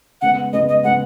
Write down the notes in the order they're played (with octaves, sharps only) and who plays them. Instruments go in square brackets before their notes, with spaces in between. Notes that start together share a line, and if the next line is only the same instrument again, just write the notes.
[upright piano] C#3 G#3 B3 [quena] F#5
[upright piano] C#3 G#3 B3 [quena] D#5
[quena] D#5
[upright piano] C#3 G#3 B3 [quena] F#5